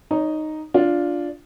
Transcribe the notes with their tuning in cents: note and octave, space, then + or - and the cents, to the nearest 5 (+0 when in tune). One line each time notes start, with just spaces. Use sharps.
D#4 -5 C#5 +25 A#5 +0
D4 -10 F4 +0